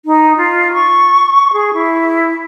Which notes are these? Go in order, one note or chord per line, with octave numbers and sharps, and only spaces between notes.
D#4
F4
C#6
G#4
E4